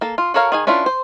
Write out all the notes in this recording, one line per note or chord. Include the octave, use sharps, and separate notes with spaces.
A#3 A4
F4
F#4 A4 A#4 C#5 F5
D#3 G#4 G#5
C#4 D4 E4 F4 B4
C5